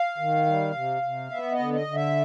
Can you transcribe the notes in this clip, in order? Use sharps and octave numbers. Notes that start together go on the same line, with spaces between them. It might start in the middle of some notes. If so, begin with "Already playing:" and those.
Already playing: F5
D#3
G3
C3
C3
B3 E5
D#5
D3
D#5
D3
E5